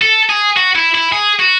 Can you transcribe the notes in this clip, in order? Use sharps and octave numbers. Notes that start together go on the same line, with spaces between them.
A4
G#4
F#4
E4
E4
G#4
F#4